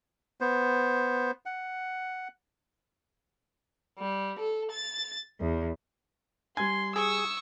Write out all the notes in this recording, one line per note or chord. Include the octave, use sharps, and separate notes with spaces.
B3 C5
F#5
G3
A4
A6
E2
G3 G#5 C6 G#6
G#4 C#6 D#6 E6